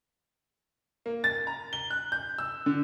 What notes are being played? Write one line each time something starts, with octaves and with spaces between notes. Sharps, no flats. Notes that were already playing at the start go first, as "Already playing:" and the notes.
A#3
A6
A#5
G7
F#6
G6
E6
D3